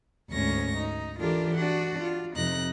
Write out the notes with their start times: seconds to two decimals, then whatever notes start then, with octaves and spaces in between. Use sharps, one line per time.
0.31 D2 G#2 C#4 C#6 A#6
0.78 D#4
1.20 E3 D4 F4 G4 A4 A#4
1.55 D4 F#4 F#5
2.01 F4
2.36 F2 C3 D#4 F#6 A#6